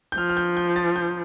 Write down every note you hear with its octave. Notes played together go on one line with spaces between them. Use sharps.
G6
F3 F6
F6
G6
G6
A6
G6